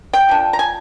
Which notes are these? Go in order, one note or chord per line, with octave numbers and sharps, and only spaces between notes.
G5
F3 A#3 D4
A#5
G#5